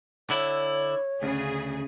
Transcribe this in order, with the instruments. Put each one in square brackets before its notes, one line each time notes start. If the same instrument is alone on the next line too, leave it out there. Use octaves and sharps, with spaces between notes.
[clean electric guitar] D3 E4 [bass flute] C#5
[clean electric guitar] D2 [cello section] C#3 G#4